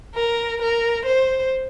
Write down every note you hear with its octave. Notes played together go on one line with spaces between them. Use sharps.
A#4
A#4
C5